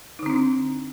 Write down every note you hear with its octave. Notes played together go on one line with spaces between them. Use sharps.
D3 C4 D4 D#4